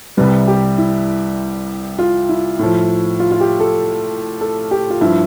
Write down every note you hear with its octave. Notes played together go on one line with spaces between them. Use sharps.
C2 C3 G3 B4
G4
E4
F4
E4
A2 F3
F4
F4
G4
A4
A4
G4
F4
G2 F3 E4